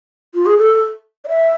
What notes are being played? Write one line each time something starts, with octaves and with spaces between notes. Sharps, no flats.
F4
G#4
A4
D5
E5